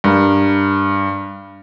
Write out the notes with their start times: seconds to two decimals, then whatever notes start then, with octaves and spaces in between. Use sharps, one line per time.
0.04 G2 A#4